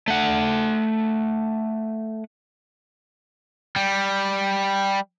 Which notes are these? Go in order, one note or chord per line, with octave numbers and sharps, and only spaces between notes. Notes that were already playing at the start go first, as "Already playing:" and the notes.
A3 F#5
G3